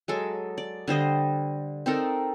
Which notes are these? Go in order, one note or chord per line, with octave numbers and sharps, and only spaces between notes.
F#3 G#3 A4
D5
D3 G3 C5 D#5
C4 D#4 A4 A#4